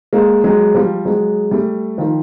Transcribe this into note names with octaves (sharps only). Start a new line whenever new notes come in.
G#3 A#3
F#3 G#3
F3 G3
F#3 G#3
G3 A3
D#3 F3